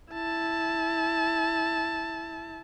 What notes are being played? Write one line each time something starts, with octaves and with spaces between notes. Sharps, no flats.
E4 A5